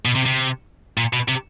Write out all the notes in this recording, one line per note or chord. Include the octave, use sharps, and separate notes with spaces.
B2
C3
C3
A#2
B2
C3